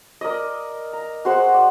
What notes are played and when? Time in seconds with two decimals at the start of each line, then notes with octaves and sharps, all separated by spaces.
0.21 A#4 D5 D#5
0.93 A#5
1.25 F#4 G#4 C5 F#5
1.54 D5